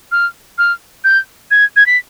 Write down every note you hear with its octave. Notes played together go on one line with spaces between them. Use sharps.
F6
F6
G6
G#6
G#6
B6